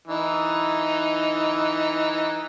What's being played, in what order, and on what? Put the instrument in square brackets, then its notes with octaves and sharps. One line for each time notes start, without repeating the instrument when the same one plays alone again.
[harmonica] E3 D#4